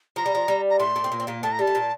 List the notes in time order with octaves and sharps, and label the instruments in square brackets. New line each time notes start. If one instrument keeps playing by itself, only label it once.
[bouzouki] F3 [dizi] A#5
[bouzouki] G3
F3
G3
[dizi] A#5
[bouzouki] A2 A3 [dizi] C6
[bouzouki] A2 A3
C4
A#2 A#3
C4
A#2 A#3
[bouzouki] A2 A3 [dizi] A5
[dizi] A#5
[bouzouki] G3 [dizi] A5
[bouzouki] A3
A#2 A#3